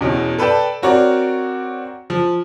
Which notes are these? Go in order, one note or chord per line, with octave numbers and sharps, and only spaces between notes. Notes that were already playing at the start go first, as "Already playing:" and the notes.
E2 B2 C#4
A4 B4 D5 G5 A5
C4 F#4 A#4 C#5 D5
F3